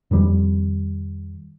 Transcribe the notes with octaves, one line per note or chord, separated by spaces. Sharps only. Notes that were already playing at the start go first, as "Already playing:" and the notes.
F2 D#3 G3